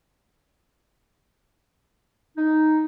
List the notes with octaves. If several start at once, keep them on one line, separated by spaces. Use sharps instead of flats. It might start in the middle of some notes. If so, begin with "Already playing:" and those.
D#4